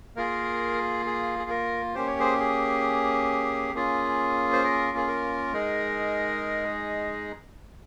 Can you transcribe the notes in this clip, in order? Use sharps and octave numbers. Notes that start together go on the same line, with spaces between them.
A#3 F4 G#4 A#4
G#4
G#4
A#4
A#3 C#4 G4 C5
C#5
G#4 C5
G#4
A#3 C#4 F4 G#4
C5
A#4
G#4
A#4
G#3 D#4 G#4